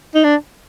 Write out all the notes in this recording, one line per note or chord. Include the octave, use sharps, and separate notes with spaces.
D#4
D4